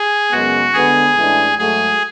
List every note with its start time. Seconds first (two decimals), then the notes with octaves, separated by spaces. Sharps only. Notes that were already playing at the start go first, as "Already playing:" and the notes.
Already playing: G#4
0.32 F#2 C#3 G#3 B3 F#4
0.73 D3 G#3 B3 G#4
1.16 A1 A2 E3 G#3 D4
1.58 G#2 F#3 A3 G#4